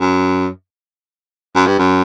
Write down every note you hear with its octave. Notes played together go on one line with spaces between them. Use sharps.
F#2
F#2
G2
F#2